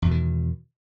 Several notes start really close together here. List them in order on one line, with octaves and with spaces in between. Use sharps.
E2 B2 D#3